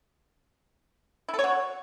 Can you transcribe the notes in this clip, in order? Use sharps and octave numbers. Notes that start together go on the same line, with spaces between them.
E4
A4
C#5
F#4